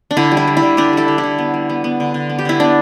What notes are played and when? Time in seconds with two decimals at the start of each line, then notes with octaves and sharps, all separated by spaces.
0.11 D4
0.17 D3 E4
0.31 G3
0.37 E4
0.47 G3
0.57 E4
0.63 D3
0.77 D3 D4 G4
0.93 G3 E4 A4
1.08 D3
1.18 E4
1.23 D3
1.38 B3
1.54 G3
1.69 B3
1.84 B3
2.00 D3
2.14 D3
2.29 B3
2.39 G4
2.45 D3 E4
2.60 B3 D4